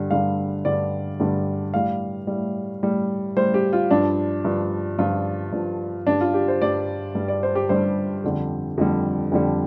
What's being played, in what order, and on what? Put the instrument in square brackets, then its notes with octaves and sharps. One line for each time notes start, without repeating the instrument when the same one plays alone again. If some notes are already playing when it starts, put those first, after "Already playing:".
Already playing: [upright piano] G2 D3 G3
G2 D3 G3 F5
G2 D3 G3 D5
G2 D3 G3
A2 G3 F5
A2 G3
A2 G3
A2 G3 C5
G4
F4
G2 F3 D4
G2 F3
G2 F3 F4
G2 F3
G2 G3 D4
F4
G4
C5
G2 G3 D5
G2 G3
D5
C5
G4
G2 G3 C5
F2 D3 G3
F2 D3 G3
F2 D3 G3